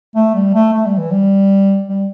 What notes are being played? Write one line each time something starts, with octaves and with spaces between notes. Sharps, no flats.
A3
G3
A3
A3
G3
E3
G3
G3